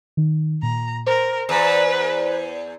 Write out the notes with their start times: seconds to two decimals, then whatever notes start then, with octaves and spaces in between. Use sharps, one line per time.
0.17 D#3
0.63 A#2 A#5
1.07 A#4 C5
1.49 E2 B4